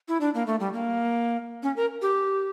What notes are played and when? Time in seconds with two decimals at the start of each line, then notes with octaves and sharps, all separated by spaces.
0.08 E4
0.21 D4
0.34 A#3
0.47 A3
0.60 G3
0.73 A#3
1.63 C#4
1.76 A#4
2.02 G4